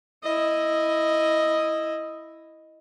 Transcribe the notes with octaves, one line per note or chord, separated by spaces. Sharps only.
E4 D#5